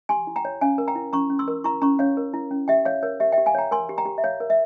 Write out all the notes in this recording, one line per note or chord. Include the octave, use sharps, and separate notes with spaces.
G4 G#5 C6
E4
G5 A#5
C#5
C#4 F5 G#5
A#4
G5 A#5
E4
C#4 A#5 C#6
C#4
C6 E6
A#4
E4 A#5 C#6
C#4 A#5 C#6
C#4 C#5 F5
A#4
E4
C#4
G4 E5 G5
C#5 F5
A#4 C#5
G4 E5
E5 G5
G4
F5 G#5
C#5 G5 A#5
A#4 G#5 C6
G4
G5 A#5
G4
E5
C#5 F5
A#4
E5